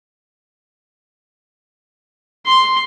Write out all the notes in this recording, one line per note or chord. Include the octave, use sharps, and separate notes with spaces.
C6